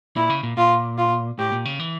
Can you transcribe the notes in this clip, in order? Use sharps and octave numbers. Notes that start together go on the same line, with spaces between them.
A#2 E4
C#3
A#2
A#2 F4
F4
A2 G4
A#2
C#3
E3